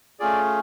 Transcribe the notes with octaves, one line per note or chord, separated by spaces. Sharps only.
A3 C#4 F4 G#4 D5